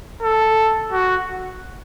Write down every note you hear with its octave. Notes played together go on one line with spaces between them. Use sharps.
A4
F#4